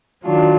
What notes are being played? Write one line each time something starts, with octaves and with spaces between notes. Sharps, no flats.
D#3 F#3 D4 F4